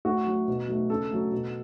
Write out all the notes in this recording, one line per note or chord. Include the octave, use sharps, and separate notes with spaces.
A2 F#4
F#3 A3
B2
F#3 A3
C#3 A4
F#3 A3
B2